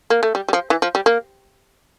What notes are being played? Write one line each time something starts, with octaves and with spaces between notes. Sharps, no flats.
A#3
A3
G3
G3
F3
E3
F3
G3
A#3